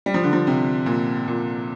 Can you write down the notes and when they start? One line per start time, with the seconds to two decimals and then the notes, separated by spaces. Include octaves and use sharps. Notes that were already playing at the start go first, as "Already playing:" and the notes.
0.06 G3
0.14 F3
0.24 D3
0.33 F3
0.47 C3
0.86 A#2
1.28 A#2